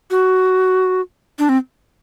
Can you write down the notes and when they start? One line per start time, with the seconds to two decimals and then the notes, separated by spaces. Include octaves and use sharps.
0.11 F#4
1.39 D4
1.49 C4